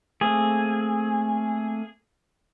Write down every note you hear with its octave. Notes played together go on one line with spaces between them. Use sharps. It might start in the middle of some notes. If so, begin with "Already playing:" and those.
A3 A#3 C4 G#4